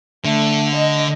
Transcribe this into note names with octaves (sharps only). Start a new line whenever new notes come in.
D3 A3
D#5